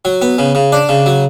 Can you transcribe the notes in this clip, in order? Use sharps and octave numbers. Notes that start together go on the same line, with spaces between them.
F#3
B3
C#3
C#3
D4
C#3
F#3